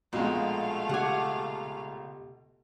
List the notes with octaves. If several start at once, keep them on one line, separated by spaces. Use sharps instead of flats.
A#1 B2 G#3 A3 F5
C#3 G4 F#5 G#5 D6